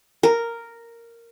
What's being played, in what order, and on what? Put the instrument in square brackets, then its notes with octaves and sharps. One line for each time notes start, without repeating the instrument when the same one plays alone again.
[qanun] A#4